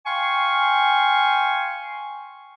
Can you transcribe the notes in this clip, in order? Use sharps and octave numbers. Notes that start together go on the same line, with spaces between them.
F5 G5 G#5 C6 C#6